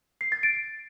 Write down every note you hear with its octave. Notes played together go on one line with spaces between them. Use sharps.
C7
A6
D7